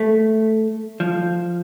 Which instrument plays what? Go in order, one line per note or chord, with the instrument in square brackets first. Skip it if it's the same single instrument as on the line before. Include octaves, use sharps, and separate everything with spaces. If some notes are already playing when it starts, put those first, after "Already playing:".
Already playing: [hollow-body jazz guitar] A3
F3